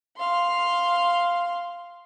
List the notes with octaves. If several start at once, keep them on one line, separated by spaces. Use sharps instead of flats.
F5 C6